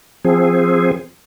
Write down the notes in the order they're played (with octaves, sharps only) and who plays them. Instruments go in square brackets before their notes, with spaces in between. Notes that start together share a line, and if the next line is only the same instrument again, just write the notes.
[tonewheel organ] F3 C4 G#4